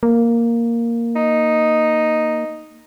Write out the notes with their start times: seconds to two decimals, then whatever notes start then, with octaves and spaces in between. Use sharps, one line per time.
0.03 A#3
1.16 D#4